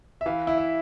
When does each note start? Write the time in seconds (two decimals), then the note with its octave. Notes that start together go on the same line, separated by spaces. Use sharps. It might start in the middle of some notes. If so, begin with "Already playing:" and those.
0.21 E5
0.26 E3 F5
0.47 E4
0.58 E5